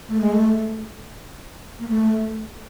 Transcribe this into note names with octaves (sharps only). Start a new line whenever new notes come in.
A3
G#3
A3
A#3
A3